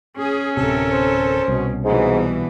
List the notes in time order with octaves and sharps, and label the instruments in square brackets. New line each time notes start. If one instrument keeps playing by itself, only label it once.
[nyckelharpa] C#4 [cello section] G#4
[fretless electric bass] D1 C3 [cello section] A4 A#4
[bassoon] C5
[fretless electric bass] C2 [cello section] B2
[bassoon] G#2 [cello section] B2 E3 G3